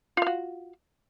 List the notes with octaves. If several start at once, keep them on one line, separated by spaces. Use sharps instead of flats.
F4 F#4 F5